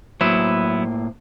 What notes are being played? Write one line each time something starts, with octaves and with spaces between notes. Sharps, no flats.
A2 F#3 A#3 B3 E4 C5